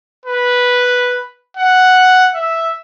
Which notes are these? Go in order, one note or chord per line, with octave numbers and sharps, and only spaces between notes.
B4
F#5
E5